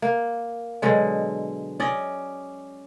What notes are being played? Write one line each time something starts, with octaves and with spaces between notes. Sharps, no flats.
A#3
B2 D3 F#3 G#3
C#4 D5 D#5